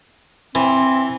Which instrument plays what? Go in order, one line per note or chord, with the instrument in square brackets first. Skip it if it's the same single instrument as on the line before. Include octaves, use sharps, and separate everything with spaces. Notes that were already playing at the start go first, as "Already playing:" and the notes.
[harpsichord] E3 [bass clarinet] C4